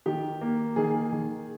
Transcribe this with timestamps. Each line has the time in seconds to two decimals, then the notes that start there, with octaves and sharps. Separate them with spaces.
0.06 D#3 G4
0.41 A#3
0.76 D#3 G#4
1.12 D#3